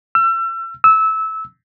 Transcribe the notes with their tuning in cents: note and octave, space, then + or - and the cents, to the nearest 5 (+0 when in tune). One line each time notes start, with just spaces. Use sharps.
E6 +35
E6 -20